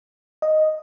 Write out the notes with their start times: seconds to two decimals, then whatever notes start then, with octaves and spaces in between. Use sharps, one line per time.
0.42 D#5